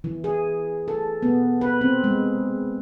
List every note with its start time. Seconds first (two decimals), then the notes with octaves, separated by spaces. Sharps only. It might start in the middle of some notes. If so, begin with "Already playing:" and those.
0.04 E3
0.24 G#4
0.88 A4
1.23 B3
1.61 B4
1.81 C4
2.04 G#3